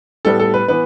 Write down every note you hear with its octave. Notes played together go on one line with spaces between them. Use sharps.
A2 G3 B3 A4
A4
B4
E3 B3 B4